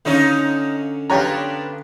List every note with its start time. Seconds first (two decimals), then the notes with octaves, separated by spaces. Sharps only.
0.05 D3 C#4 D#4 F4 C#5
1.10 B3 D4 F4 G4 C#5 A#5